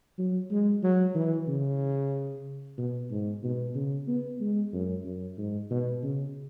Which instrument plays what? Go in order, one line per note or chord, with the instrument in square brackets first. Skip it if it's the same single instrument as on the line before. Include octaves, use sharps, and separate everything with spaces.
[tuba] F#3
G#3
F#3
E3
C#3
B2
G#2
B2
C#3
B3
G#3
F#2
F#2
G#2
B2
C#3